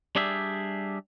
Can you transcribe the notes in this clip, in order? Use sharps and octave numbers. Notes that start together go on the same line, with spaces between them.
G3 D4 G4 G#4 E5